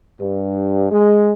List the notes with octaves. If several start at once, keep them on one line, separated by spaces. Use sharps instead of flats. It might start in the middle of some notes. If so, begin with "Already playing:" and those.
G2
G#3